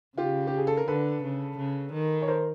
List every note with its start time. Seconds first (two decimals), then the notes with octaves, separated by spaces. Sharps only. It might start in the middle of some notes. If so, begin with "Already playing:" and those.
0.17 C#3 F4 G4
0.47 G4
0.58 G#4
0.67 A4
0.77 A#4
0.88 D3 A4 B4
1.23 C#3
1.58 C#3
1.93 D#3
2.22 C#5
2.28 A#4 C5